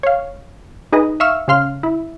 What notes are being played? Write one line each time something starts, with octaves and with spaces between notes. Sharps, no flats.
C#5 F5
D#4 G#4 B4 D#5
E5 F5 C#6 E6 F6
C#3 C#4 F5 C6 F6
E4